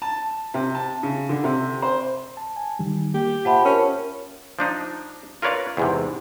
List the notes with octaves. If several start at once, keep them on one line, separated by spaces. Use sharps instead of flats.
A5
C3
A5
C#3
D3
C3
C5
A5
G#5
D#3 G3
A#3 G4
F4 C5 E5 F#5 A5 B5
C#4 A#4
F3 D4 D#4
F4 A#4 B4 C#5 D5 F5
E2 G#2 C3